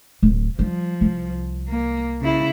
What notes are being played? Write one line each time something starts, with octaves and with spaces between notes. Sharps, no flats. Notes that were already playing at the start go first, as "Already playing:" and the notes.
D1
F3 G3
C2
A#3
C#3 E4